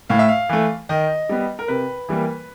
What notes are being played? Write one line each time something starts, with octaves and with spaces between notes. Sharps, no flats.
A2 F5
E5
F5
E3 A3
D#3 D#5
G3 B3
A#4
C3 B4
E3 G3 A#3